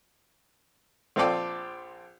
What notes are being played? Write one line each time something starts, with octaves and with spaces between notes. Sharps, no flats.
A#1 C4 F4 A4 D5 G5